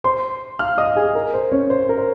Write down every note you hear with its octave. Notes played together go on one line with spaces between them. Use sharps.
C5 C6
F5 F6
D#5 D#6
G#4 G#5
A#4
C5
C#4 C#5
C5
A#4
C5